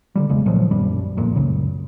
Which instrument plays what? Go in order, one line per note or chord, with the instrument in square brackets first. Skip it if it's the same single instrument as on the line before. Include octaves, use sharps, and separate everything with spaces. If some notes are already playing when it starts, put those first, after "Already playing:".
[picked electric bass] D3 F#3 G3
E1 B1 C#3 G#3
A#2 D#3 F3 F#3
F#1 B1 F#2 G3
B1 F2 A#2
F#1 C#2 C#3